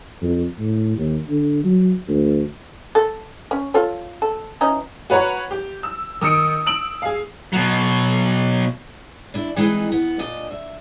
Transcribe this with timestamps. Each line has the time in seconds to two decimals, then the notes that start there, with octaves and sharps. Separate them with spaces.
0.21 F2
0.59 A2
0.96 D#2
1.28 D3
1.64 F#3
2.08 D2
2.95 A4
3.51 C#4
3.74 F4 A4 C#5
4.22 A4
4.61 E3 C#4 D#4
5.10 F#4 B4 C#5 F#5 A#5
5.51 G4
5.83 E6
6.21 D#3 D#6 E6 C#7 D7
6.66 E6 D7 F#7
7.02 G#4 F5
7.53 B2 F#3
9.34 D4 E4
9.57 E3 G#3 C4 D#4 A#4 B4
9.92 B3
10.19 A#2 D4 D#5
10.51 E5